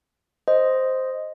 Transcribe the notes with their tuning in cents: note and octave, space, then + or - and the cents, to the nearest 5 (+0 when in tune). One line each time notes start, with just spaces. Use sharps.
C5 +0 D#5 +0